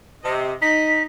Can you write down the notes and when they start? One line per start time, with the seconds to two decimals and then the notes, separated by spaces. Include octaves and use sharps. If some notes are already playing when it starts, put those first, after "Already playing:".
0.24 C3 D#5
0.62 D#4 B6